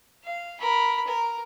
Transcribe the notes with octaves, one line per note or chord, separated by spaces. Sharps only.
F5
A#4 B5
A#4